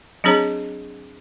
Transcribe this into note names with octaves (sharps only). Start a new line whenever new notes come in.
F#3 C4 D4 G#4 C#5 A#5